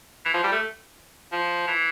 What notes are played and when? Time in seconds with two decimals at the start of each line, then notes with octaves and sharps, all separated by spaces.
0.25 E3
0.34 F3
0.44 G3
0.52 A3
1.32 F3
1.68 E3